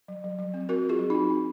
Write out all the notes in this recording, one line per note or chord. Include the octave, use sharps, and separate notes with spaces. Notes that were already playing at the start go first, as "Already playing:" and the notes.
F#3
F#3
F#3
C4
C4 F#4 A#4
C4 F4 G#4
F#3
C4 D#4 F#4
C4